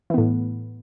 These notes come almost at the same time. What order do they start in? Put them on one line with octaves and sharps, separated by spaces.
E3 B3 A2